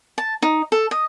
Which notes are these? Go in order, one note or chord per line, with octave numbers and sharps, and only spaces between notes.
A5
D#4
A4
D#5